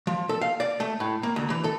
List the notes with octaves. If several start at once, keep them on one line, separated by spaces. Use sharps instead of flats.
F3
A4
F5
D5
A3
A2
A#3
D2
E3
A4